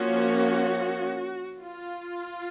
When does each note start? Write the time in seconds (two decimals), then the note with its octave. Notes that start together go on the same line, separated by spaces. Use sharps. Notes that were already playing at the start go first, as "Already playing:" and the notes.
Already playing: F3 A#3 C#4 F#4
1.62 F4